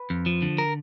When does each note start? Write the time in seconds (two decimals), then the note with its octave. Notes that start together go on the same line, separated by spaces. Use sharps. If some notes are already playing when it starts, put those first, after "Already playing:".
Already playing: B4
0.10 F2
0.26 F3
0.42 D3
0.58 A#4